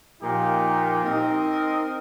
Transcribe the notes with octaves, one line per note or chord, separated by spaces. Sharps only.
A#2 F3 A#3 D#4 G4
C4 D#4 A#4 D#5